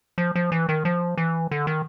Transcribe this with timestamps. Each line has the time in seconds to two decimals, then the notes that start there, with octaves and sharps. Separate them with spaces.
0.18 F3
0.35 F3
0.52 E3
0.69 D#3
0.85 F3
1.17 E3
1.51 D3
1.67 D#3